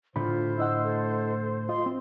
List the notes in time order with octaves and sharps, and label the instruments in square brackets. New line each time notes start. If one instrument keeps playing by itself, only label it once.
[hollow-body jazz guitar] A2 D3 A3 [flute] F4 [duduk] C5 [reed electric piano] B5
[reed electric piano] E4 D#5 F#5 [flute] E6
[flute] A4
[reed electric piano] F4 D#5 [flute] C6
[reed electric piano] C4